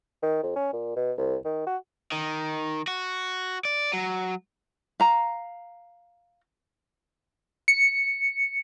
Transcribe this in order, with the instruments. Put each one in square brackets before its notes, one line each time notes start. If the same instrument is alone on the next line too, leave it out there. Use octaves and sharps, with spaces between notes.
[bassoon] D#3
F2
C#4
A#2
B2
C2
D#3
F#4
[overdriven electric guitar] D#3
F#4
D5
F#3
[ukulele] F5 A#5
[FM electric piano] C#7